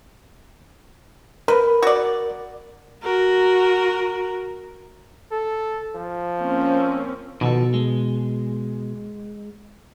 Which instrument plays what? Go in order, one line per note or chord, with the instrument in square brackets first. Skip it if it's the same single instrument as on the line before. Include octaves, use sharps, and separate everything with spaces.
[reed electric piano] A#4 [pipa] B4
[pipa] F#4 D5
[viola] F#4 A#4
[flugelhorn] A4
F3
[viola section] A#3 C4 C#4
[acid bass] B2 [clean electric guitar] D#3 F3 A4
[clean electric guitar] G#3